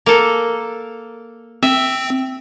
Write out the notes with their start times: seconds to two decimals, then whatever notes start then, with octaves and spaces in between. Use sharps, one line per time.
0.06 A#3 A4
1.63 C4 E5